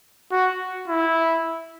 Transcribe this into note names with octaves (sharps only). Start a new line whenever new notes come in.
F#4
E4